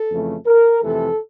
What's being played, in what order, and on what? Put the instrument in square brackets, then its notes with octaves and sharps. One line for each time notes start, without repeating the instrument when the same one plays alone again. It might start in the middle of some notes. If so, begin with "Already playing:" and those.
Already playing: [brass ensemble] A4
F2 C#3 E3 A3
A#4
F2 C3 E3 A3 A4